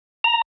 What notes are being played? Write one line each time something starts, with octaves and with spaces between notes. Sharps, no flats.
A#5